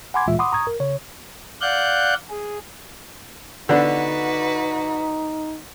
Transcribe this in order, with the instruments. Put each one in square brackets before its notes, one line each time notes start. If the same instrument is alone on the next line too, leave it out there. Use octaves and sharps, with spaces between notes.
[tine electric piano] F#5 G#5 B5 C6 D6 G#6
D2 A#2 E3 G#3 F4 E5
F#5 B5 C6 D6 D#6
A#5 C#6 D#6 G#6
A#4
C#3 C#5
[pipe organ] D5 F5 F#5 F#6 G6
G#4
[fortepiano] D3 B3 D4 [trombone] D#4 [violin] F#4 B4